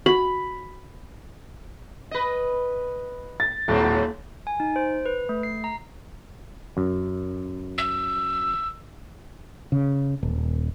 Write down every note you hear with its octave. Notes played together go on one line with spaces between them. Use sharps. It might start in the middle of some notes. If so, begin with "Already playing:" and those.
F#4 B5
B4 D#5
A6
D#1 G#2 F#3 C4
G#5
D#4
C5
B4
A3
C7
A#5
F#2
E6
C#3
D#1